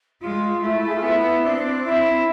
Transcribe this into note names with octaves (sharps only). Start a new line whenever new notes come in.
G#3 F4
A3 E4
G#4
F4
B3 E4
C4 D4
E4